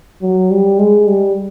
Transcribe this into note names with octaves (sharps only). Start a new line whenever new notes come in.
F#3
G3
G#3
G3